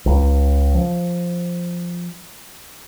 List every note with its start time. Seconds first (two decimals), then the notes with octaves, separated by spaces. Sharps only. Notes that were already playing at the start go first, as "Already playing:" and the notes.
0.06 C#2
0.75 F3